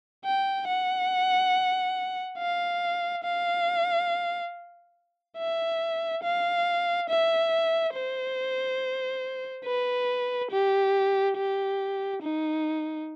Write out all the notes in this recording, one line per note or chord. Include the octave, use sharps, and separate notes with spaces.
G5
F#5
F5
F5
E5
F5
E5
C5
B4
G4
G4
D#4